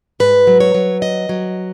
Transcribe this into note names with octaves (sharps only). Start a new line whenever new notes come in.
G#2 B4
F#3
C#5
F#3
D#2 D#5
F#3